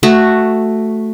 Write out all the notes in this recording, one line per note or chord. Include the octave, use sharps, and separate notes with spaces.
A3 F#4